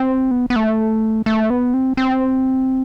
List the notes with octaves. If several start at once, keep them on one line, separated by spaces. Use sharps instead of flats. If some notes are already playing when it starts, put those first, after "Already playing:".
Already playing: C4
B3
B3
A3
A3
B3
C4
C4